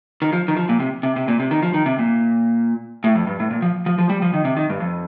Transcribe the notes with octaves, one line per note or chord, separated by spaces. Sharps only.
D#3
F3
D#3
F3
A#2
C3
C3
C3
A#2
C3
D#3
F3
D#3
C3
A#2
A2
F2
G2
A2
A#2
F3
F3
F3
G3
F3
D#3
C3
D#3
G2
F2